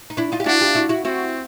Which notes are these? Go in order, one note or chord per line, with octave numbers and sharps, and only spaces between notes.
D#4
D4 E4
D#4 F4
G4
D4 E4 F#4
F4 G4
E4 F#4
E4 F#4
C4 E4 F#4